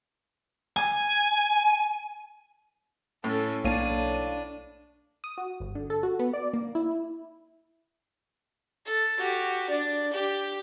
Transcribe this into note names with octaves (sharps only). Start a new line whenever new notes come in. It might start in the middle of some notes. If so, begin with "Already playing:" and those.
G#5
A2 C#4 A4
B1 A#3 D4 C#5 F5 A5 D#7
D#6
F#4
G1
D3
A4
F#4
B3
D5
A#3
E4
A4
F#4 G4
D4 D5
G4